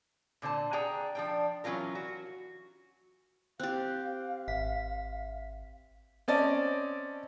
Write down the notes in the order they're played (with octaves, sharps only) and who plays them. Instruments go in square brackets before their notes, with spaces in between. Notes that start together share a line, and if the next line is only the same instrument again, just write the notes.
[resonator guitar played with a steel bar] A#2 D3 C5 A5
G#4 D5 F#5 G5 A#5
F3 D4 G5
E3 F#3 C#4 F4 A#4
F#4
[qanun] C4 G4 [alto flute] F5 [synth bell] F#6
[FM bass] G#1 [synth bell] E5 B6
[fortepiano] C4 C#4 D5 D#5 A5